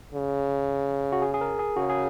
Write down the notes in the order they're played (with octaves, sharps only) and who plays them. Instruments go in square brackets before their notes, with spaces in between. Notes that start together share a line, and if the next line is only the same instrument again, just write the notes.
[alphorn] C#3
[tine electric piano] F#4
G#4
G#4
A#4
G#4
[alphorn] C#3 [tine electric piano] F#4
[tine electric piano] G#4